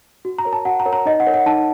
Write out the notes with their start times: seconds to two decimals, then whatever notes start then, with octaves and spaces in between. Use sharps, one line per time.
0.25 F#4
0.38 A#5
0.45 A#4 C#5
0.53 A5
0.65 F#4 F#5
0.80 A#5
0.86 A#4 C#5
0.93 A#5
1.06 D#4 D#5
1.20 F#5
1.27 A#4 C#5
1.34 F#5
1.46 D#4 A5